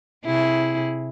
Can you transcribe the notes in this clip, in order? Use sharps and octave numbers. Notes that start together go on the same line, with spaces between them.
C3 E4 G#4